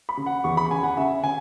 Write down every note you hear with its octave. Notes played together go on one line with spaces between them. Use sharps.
B5
C#3
F#5
E2 C#6
B5
C#3 G#5
F#5
C#3 E5
C#3 G#5